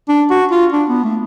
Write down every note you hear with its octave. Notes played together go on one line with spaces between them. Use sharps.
D4
F#4
F4
D4
B3
A3